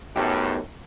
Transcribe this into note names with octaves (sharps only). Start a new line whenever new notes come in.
F#2 A2 B3 D#4 G4